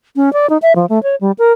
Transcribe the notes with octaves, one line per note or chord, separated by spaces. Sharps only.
C#4
D5
D#4
E5
F3
A3
C#5
G3
A#4